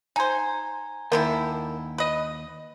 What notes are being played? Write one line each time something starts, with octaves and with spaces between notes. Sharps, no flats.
D#4 C5 G#5 A#5 G#6
D#2 D3 D#3 E4 A#4
B4 D#5